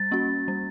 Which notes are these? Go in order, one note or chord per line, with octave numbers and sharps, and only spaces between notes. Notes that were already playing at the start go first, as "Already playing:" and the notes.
Already playing: G3 A6
A#3 C#4 F#4
G3